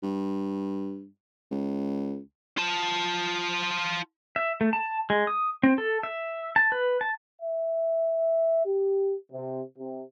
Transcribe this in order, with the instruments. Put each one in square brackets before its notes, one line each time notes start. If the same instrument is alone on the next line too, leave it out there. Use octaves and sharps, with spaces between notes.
[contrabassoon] G2
C#2
[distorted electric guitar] F4 A5
[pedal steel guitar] E5
A3
A5
G#3
D#6
C4
A4
E5
A5
B4
A5
[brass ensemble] E5
G4
C3
C3